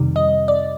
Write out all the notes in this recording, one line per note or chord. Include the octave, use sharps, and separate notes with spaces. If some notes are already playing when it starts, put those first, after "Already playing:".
Already playing: F2 C3 D#3 G3
D#5
D5